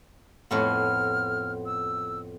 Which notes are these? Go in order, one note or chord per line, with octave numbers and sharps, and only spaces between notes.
F2 A2 B3 F6
E6